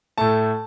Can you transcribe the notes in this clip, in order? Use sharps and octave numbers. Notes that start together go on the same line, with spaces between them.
A2 A3 A5